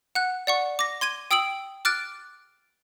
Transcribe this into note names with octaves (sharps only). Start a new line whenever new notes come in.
F#5 F#6
D5 F#5 C#6
D6 A#6
C6 G#6 D#7 G7
G5 D#6 E6 D7 F#7
D6 F6 F#6 A6 D7